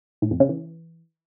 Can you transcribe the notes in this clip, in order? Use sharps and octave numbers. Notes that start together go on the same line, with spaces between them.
A2
F2
C#3
E3